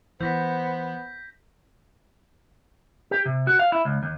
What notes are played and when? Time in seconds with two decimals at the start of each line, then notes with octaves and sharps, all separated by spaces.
0.21 E3 B3 C5 G6 A#6 B6
3.11 G4
3.26 C3
3.47 F#4
3.59 F5
3.72 E4
3.85 C#2
4.03 D#2